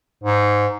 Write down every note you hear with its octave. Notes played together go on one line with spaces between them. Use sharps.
G#2